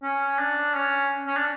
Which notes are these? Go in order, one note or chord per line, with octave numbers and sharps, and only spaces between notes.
C#4
D4
C#4
C#4
D4